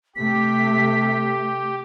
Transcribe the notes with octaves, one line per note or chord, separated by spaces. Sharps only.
C3 A3 G4 B6